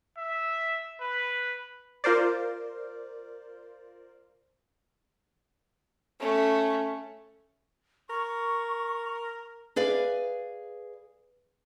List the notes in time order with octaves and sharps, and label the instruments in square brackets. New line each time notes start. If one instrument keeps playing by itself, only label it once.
[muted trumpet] E5
B4
[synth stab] F4 A#4 C5 D5
[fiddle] A3 C#4
[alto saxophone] A#4 [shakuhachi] C#6
[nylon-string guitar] G#4 B4 D5 F5